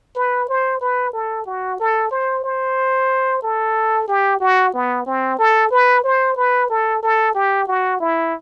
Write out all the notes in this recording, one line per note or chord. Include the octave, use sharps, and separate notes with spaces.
B4
C5
B4
A4
F#4
A4
C5
C5
A4
G4
F#4
B3
C4
A4
B4
C5
B4
A4
A4
G4
F#4
E4